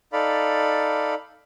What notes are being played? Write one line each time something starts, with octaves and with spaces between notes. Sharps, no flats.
D#4 A4 D5 F5 B5